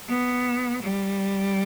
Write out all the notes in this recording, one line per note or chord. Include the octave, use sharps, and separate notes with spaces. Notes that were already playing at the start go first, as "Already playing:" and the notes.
B3
G3